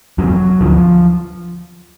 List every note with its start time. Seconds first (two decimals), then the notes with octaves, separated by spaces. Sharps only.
0.18 F1 E2 C3 F#3
0.61 D2 D3 F3